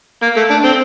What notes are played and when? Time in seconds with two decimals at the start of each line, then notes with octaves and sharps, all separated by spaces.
0.22 A#3
0.37 A3
0.50 D4
0.65 C4